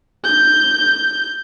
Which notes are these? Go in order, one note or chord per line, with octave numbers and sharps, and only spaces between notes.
G6